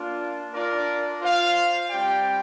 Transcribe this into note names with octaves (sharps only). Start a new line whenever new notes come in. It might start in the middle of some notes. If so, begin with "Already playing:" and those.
Already playing: A#3 D4 F4
D4 F4 A#4 D5
F4 C5 F5
G3 C4 G4 D5 G5